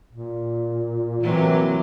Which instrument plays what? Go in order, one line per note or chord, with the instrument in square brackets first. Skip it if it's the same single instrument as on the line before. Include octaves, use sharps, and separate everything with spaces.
[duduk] A#2
[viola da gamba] C3 F#3 A#3 [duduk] E3